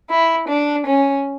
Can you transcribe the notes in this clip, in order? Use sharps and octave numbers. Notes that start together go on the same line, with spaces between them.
E4
D4
C#4